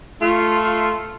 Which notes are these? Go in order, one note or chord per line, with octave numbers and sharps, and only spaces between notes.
A3 F4